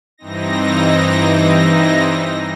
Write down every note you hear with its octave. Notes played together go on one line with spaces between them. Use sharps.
G2 E3 C4 D#4 A#6